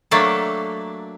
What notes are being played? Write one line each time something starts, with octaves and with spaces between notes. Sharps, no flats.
F#3 A3 A#3 D4 A4